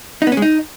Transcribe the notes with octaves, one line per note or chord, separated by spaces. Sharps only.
D#4
B3
C#4
G#3
D#4